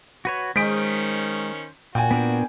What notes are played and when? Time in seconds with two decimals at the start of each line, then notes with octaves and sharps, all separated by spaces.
0.25 F#4 B4 C#5
0.56 D#3 G#3 C#4 C5 D#6 B6 D7
1.95 A#2 F#4 G5 G#5
2.11 B3 D4 A#4